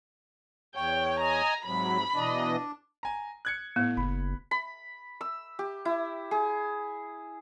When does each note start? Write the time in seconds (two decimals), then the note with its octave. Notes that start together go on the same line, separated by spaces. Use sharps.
0.76 E2 C#5 G5
1.20 D#5 G#5 A#5
1.66 G#2 C3 F#3 B5
2.14 B2 E3 D4 D#5
3.03 G#5 A#5
3.45 F#6 G#6 C#7
3.76 A2 B3
3.97 F#1 B5
4.51 B5
5.21 E6
5.59 G4
5.85 E4
6.31 G#4